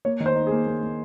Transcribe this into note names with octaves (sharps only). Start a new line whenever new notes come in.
A#3 C#5
D#3
C5
D#4
G#4
A#3
A#3
A#3